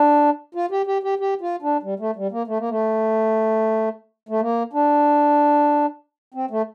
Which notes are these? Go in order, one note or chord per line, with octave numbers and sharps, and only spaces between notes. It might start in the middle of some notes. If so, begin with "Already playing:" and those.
Already playing: D4
F4
G4
G4
G4
G4
F4
D4
G3
A3
G3
A#3
A3
A#3
A3
A3
A#3
D4
C4
A3